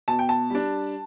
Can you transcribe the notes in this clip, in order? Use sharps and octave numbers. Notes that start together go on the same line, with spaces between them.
B2 A5
G5
A5
G3 D4